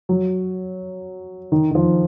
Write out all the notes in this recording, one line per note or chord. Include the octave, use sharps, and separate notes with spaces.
F#3
D#3
D#3
F3